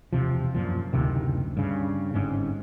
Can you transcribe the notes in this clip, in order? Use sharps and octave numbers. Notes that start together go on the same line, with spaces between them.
E1 C3 F3
F#2 A#2 F3
F#1 D2 C3 D#3
G2 C#3
G1 G#2 C4 C#4